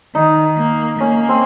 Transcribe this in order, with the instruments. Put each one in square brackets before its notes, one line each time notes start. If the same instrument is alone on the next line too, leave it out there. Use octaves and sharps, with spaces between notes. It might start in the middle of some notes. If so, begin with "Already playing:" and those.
[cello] D#3 [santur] D#4
[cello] A#3
[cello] A#3 [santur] C#4
[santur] C4